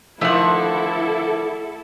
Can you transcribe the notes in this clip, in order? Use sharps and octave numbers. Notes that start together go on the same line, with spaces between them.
D3 D#3 F3 A3 E4 A4 F#5